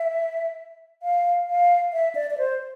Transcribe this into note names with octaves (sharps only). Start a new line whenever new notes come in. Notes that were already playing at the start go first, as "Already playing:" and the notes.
Already playing: E5
F5
F5
E5
D5
D5
C5